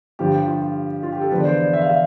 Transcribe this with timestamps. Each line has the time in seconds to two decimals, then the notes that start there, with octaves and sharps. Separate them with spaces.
0.19 G2 D3 F3 G4
0.47 F4
1.03 F4
1.12 G4
1.22 A4
1.31 E2 D3 F3 B4
1.40 D5
1.45 C5
1.59 D5
1.73 E5
1.81 F5
1.89 E5